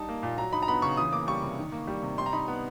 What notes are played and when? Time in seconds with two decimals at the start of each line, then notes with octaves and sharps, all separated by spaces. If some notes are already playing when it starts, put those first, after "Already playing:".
Already playing: G3 D#4 A5
0.09 A#3
0.23 A#2
0.38 F#3 A#5
0.53 D#4 B5
0.62 A#5
0.68 B3 B5
0.82 C#3 C#6
0.97 E3 D#6
1.12 A#3 D6
1.27 G3 C#6
1.43 C3
1.58 D#3
1.72 A#3
1.87 G3
2.03 C3
2.18 G3 C6
2.26 A#5
2.33 D#4 B5
2.48 B3